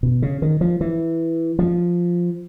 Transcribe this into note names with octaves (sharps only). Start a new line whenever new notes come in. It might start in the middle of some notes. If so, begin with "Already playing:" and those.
B2
C#3
D#3
F3
E3
F3